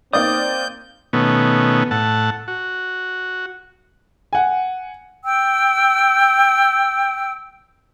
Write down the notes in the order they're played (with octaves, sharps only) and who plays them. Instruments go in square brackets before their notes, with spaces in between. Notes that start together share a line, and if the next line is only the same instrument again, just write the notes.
[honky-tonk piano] A#3 D#4 D5 [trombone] C4 [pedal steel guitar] D#6 [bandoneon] G6
[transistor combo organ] B2 D#3 A3 B3 C#4
A2 F#5 A5
F#4
[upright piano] F#5 G#5
[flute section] G5 E6